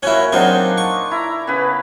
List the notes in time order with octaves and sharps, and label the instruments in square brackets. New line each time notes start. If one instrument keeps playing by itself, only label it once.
[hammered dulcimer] A#2 F#4 G#5 [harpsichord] C#4 E4
[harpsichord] F#3 C4 G#4 [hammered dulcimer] D4 D#4 F4
[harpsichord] C#6
[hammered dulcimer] E4 A#5
C#3 B3 B4